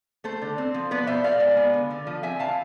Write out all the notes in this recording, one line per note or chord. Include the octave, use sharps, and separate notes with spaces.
A3 A4 C5
D3
C4
F3
B3 B4 D5
B2 C5 E5
B2 D5 F5
G#3
B3
D3
D3
F3
C4 E5 G#5
E3 F5 A5